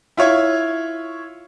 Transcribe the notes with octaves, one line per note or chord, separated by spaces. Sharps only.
E4 F4 C#5